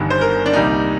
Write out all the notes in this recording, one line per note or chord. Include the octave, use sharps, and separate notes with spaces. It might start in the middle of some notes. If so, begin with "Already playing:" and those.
Already playing: G1 G2 D#3
C5
A#4
D4
C2 A#2 G3 A#3 D#4